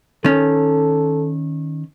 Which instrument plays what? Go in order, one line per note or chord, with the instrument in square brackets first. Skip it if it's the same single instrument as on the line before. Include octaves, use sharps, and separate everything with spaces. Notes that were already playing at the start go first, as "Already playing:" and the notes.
[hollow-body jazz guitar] D#3 C#4 [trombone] A4